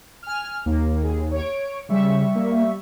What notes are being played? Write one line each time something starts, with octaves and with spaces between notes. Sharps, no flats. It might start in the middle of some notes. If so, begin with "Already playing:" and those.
G#5 F6
D#2 A#3
G#4
C#5 D7
C#3 G3 E5 C#6
A#3